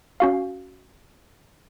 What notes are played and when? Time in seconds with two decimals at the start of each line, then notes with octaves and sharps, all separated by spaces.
0.20 C#4 F#4 F5